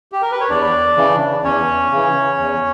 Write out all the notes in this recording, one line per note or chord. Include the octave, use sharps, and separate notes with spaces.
G4
A#4
B4
C#5
E2 D4 D5
C#3 E3
E2 C#4 C#5
C#3 E3
E2